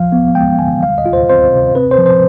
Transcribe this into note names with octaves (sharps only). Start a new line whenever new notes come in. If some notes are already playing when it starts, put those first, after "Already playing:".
Already playing: F3 F5
B3
G#3 G5
D3 G#5
G3 F5
D#5
F4
C5
C4 C5
C3
C4 B4
C5
F3
C5